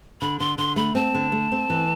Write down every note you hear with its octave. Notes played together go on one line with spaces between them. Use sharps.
D3 B5
D3 C6
D3 C6
A3 B5
C4 A5
D3
A3
C4
E3